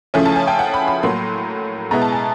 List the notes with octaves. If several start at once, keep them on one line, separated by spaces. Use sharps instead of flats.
C#3 F3 A3 C#4 E4 G#5
A5
G#5
G5
F#5
B5
B5
A2 F#3 A#3 C6
B2 G#3 B3 E4 A#5
A5
G#5